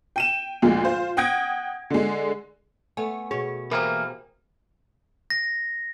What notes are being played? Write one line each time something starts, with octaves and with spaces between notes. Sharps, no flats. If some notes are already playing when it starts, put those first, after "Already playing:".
G5 D#7 E7
D2 A#2 F3 G#3
F4 C5
F#5 G5 D#6 G#6 A#6 D7
D3 G#3
A3 B3 C#5 G#5
B2 G#4 C#5
E3 A#3 G4 A#4 C5 F5
A#6